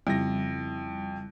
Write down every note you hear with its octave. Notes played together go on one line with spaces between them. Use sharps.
F2 C#3 G3 E4 A#6